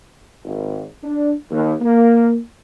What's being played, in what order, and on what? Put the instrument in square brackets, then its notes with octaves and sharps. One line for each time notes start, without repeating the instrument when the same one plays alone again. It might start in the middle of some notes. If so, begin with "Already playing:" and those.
[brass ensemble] G#1
D4
D#2
A#3